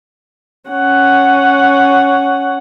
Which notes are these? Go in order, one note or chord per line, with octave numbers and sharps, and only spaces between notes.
C#4 F#5